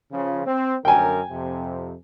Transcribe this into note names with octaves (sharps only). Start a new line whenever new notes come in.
C#3 F3
C4
F#2 D3 A#4 G5 G#5
F2 C3